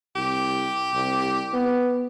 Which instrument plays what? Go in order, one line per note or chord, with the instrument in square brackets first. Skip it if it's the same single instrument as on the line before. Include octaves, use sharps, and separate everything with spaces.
[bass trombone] C2 [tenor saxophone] G4
[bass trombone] C2
B3